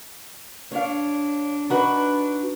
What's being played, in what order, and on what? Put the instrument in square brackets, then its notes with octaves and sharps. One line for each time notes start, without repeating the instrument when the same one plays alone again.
[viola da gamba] D4 [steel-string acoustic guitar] C#5 F5
[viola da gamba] D4 [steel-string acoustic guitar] D#4 F#4 B4